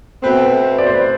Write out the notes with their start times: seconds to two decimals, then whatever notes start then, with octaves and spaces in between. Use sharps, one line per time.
0.23 B2 A3 C4 B4
0.78 D5
0.86 C5
0.94 B4